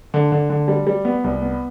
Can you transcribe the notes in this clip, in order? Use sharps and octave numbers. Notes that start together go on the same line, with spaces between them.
D3
D3
D3
G3
G3
B3
C2
B3